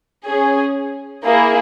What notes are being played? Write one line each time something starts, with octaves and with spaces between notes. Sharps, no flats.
C#4 G#4
A#3 E4 G#4